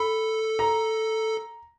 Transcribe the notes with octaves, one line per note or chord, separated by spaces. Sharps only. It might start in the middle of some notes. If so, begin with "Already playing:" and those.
Already playing: A4 B5
A#5